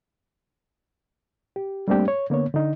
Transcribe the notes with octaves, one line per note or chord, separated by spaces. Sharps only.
G4
G3 A3 A#3 C4 D4 G4
C#5
D3 A#3 B3 C#5
D3 D#4